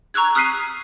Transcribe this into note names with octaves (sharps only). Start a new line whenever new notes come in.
A#5 C#6 E6 F#6 G#6
D#6 F6 F#6 B6 C7 D#7